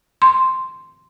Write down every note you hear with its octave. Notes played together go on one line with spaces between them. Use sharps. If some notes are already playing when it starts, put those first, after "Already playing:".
C6